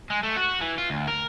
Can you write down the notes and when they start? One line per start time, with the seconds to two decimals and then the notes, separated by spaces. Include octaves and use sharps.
0.10 G#3
0.23 A3
0.36 F#4
0.61 E3
0.78 F4
0.90 D2
1.08 A#4